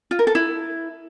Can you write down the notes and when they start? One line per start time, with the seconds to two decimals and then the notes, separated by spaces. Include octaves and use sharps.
0.11 F4
0.19 A#4
0.27 A4
0.35 E4